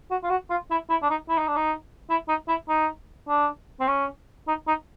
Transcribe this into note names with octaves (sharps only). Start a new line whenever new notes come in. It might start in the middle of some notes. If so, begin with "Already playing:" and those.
F#4
F4
F#4
F4
E4
E4
D4
D#4
E4
D#4
D4
D#4
E4
D#4
E4
D#4
D4
C4
C#4
D#4
D#4